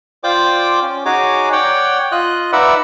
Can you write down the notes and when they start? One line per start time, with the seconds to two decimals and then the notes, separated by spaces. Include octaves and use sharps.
0.24 F4 C5 D5 G5 D6
0.82 C#4
1.05 D#4 F#4 G#4 C#5 D6
1.52 C#5 D5 F#5 G5
2.12 F4 D#5 F#6
2.53 D#4 B4 D5 E5 F#5